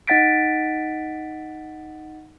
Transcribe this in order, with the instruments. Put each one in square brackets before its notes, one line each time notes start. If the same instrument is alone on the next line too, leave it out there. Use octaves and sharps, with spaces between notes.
[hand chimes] D#4 D#5 F#5 A6 B6 D7